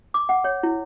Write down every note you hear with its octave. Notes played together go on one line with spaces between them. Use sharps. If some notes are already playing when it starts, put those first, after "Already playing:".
D6
F#5
C#5
E4